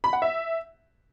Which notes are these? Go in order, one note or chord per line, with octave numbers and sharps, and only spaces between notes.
B5
F#5
E5